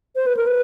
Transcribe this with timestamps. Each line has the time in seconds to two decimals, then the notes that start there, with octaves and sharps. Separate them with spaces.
0.16 C5
0.26 B4
0.37 A#4
0.47 B4